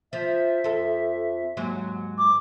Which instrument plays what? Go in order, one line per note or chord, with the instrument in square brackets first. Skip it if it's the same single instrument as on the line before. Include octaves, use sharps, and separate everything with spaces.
[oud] F3 [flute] E5
[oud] F2 A4
D#2 G#2 F#3
[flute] D6